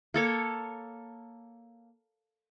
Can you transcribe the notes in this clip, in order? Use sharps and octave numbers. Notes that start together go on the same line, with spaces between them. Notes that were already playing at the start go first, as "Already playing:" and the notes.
A#3 A4 C#5